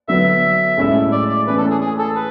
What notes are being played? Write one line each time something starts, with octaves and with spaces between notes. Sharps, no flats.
D3 F#3 B3 E5
A2 G#3 C#4 E4 A4
D5
D5
E3 A3 C#4 B4
A4
G#4
G#4
A4
B4